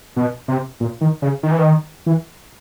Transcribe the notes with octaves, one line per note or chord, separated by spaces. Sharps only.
B2
C3
A#2
D#3
C#3
D#3
E3
D#3
E3